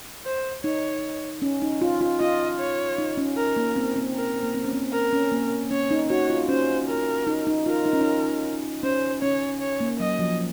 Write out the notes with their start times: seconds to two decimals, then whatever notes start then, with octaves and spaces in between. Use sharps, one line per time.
0.25 C5
0.64 D#4 C#5
1.42 C#4
1.62 D#4
1.81 F4
2.01 F4
2.20 F4 D#5
2.59 C#5
2.98 D#4
3.18 C#4
3.37 A#4
3.57 A#3
3.76 C4
3.96 C4
4.15 A#4
4.43 A#3
4.55 C4
4.64 C#4
4.73 C4
4.93 A#4
5.13 C#4
5.32 A#3
5.71 C#4 C#5
5.91 D#4
6.10 F#4 C#5
6.30 F4
6.49 C#4 C5
6.88 A#4
7.27 D#4
7.47 D#4
7.66 F4 A#4
7.86 D#4
7.93 C#4
8.01 D#4
8.83 C#4 C5
9.22 C#4 C#5
9.61 C#5
9.80 A#3
10.00 F#3 D#5
10.19 F3